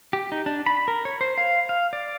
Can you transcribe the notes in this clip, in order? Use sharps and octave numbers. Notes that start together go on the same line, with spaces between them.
G4
D#4
D4
B5
A#4
C#5
C5
F5
F5
D5